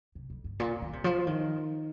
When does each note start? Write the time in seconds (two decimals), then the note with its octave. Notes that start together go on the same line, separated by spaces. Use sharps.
0.15 C3
0.30 F2
0.44 G2
0.60 A#2
0.82 D#3
0.93 C3
1.04 F3
1.27 D#3